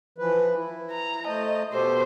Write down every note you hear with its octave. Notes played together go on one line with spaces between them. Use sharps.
E3 F3 B4
E4
A#5
A3 C5 D#5 A5
B2 G4 A4 C5